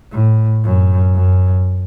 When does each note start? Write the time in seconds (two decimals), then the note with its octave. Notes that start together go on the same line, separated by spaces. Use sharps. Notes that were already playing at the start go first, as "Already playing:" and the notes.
0.12 A2
0.64 F#2
1.15 F#2